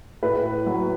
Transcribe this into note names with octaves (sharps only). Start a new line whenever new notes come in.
A2 B4
F#3